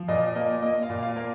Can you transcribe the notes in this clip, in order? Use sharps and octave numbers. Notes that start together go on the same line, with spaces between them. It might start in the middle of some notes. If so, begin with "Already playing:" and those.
Already playing: F3
A#2 D#5
A#3 D#5
A#3 D#5
F5
A#2
F5
A#3